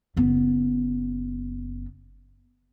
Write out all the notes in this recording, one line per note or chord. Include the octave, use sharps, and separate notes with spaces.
F#1 B3